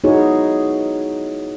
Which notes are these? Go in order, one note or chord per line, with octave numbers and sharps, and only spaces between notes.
B3 D#4 E4 F#4 G#4 C#5